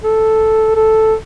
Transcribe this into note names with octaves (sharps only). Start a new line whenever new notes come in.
A4
A4